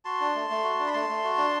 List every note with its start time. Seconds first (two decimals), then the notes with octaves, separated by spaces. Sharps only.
0.05 F#4 A5 C6
0.21 D4
0.35 A3
0.50 A3
0.64 F#4
0.80 D4
0.87 B5
0.93 A3 A5 C6
1.09 A3
1.24 F#4
1.38 D4